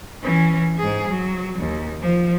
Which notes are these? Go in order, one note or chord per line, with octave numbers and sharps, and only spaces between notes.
E3 C#4
G#2 G#4
F#3
D#2
F3